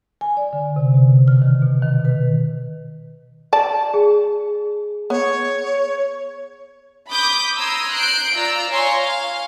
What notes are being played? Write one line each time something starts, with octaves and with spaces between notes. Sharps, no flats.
G#5
D5
D3
C3
B2
F6
D#3
B2
D#3
B4
D5 A5
G#4
B3 C#5
B5 D6 D#6 G6
A#5 C6 D#6 E6 G#6
F#6 G6 C7 D7
F4 D5 A#5 E6
C#5 F5 G#5 A#5 C6 C#6
F5